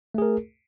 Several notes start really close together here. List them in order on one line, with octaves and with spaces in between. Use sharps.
A3 G#4 A#4